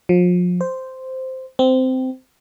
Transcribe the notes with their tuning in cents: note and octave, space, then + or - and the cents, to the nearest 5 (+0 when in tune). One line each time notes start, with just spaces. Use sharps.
F3 +35
C5 -5
C4 -15